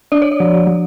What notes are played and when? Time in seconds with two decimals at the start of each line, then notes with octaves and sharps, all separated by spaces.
0.12 D4 D5
0.22 C#5
0.32 D5
0.40 F3
0.67 F3